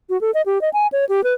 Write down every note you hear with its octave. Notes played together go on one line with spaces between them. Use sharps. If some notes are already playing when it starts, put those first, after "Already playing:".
F#4
A4
D#5
G4
D#5
G#5
C#5
G4
B4